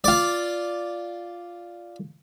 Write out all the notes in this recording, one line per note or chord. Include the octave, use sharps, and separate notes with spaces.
F4 D5